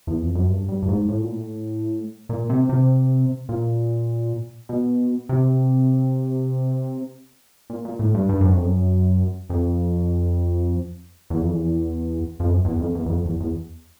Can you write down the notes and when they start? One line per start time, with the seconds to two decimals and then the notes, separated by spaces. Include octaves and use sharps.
0.07 E2
0.22 F2
0.35 F#2
0.50 G2
0.69 G2
0.83 G2
0.89 G#2
1.09 A2
1.20 A#2
1.31 A2
2.29 A#2
2.50 C3
2.69 C3
3.49 A#2
4.69 B2
5.29 C3
7.70 A#2
7.85 A#2
7.99 A2
8.15 G2
8.29 G2
8.41 F#2
8.53 F2
8.64 F#2
9.50 F2
11.30 E2
11.41 F2
11.52 E2
12.40 F2
12.50 F#2
12.65 E2
12.80 F2
12.95 E2
13.06 E2
13.09 F2
13.25 E2
13.40 E2